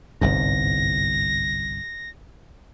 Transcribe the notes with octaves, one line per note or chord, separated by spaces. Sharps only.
G1 C2 G#2 A#6